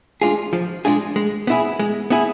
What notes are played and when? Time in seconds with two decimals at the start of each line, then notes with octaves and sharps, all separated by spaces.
0.22 G#3 D4 F4 G#4
0.53 F3
0.85 G#3 D4 F4 G#4
1.16 G#3
1.47 B3 E4 G#4
1.79 G#3
2.10 B3 E4 G#4